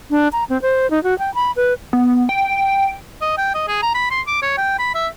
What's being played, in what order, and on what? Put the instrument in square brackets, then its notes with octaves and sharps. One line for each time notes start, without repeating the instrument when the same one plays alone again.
[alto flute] D4
A#5
C4
C5
D#4
F#4
G5
B5
B4
[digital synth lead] B3
G5
[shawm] D#5
G5
D#5
G#4
A#5
B5
C6
D6
C#5
G5
B5
E5